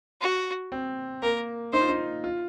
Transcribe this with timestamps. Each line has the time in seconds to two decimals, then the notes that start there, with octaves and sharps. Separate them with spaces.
0.21 F#4
0.72 C4
1.22 A#3 A#4
1.73 D#4 C5
1.81 F4
1.89 D#4
2.24 F4